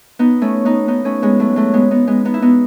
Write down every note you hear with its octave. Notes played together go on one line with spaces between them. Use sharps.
B3 D#4
A3 C#4
B3 D#4
B3 D#4
A3 C#4
G#3 B3
F#3 A3
F#3 A3
G#3 B3
B3 D#4
G#3 B3
B3 D#4
E4
B3 D#4